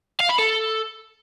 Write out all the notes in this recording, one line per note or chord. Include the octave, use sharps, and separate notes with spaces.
F5
B5
A4